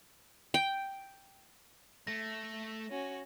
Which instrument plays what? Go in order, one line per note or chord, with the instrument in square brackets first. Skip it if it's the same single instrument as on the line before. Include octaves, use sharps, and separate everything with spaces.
[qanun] G5
[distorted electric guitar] A3 [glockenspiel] A#6
[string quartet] C#4 F#4